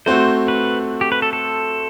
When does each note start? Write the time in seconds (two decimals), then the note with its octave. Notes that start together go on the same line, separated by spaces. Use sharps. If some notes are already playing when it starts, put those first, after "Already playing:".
0.06 A3 C4 F#4 C5
0.48 B4
1.01 G4
1.12 B4
1.22 A4
1.33 A4